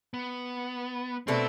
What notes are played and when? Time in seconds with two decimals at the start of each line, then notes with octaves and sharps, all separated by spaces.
0.14 B3
1.27 B2 A3 C4 D4